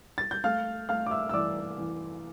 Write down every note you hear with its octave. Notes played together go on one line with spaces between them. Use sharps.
A6
G6
A3 F5 F6
A3 F5 F6
D6
E5 E6
E6
E3 D5 D6
E3